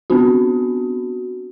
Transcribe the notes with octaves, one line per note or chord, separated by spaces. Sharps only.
B3 C4 D4 F#4